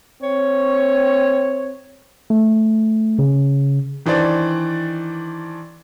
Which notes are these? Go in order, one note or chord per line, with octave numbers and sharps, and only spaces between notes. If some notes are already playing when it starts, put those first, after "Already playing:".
C4 C#5
A3
C#3
D#3 E3 D4 C5 D5